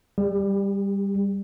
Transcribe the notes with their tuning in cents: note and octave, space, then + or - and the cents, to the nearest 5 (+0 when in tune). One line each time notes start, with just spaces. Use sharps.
G3 +15 G#4 -45